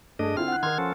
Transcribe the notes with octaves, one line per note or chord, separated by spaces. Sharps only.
G2 A3 D4 G#4 D#5
D3 C4 E4 F4 F6
F#5 F#6
D#3 A#4 C6 F6 G#6
F3 C#4 A4